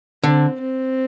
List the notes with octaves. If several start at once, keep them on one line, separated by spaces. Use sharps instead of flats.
D3 C4
C4